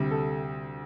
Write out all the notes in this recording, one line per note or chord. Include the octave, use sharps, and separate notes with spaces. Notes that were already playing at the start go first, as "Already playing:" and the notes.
Already playing: D2 C3 G3
A4